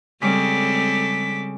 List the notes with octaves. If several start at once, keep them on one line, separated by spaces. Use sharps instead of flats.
C#3 G3 G#3 C4 A4 D6 B6